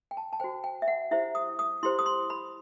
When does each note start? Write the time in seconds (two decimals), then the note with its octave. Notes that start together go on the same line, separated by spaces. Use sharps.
0.11 G5
0.17 A5
0.33 A5
0.40 F#4 C5 G5
0.64 G5
0.82 E5
0.88 F#5
1.11 E4 G4 C5 E5
1.35 D#6
1.59 D#6
1.83 E4 G4 C5 C6
1.99 D#6
2.06 C6
2.30 B5